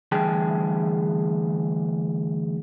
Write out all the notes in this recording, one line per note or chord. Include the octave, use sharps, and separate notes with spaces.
D2 E3 G3 G#4 G5 A5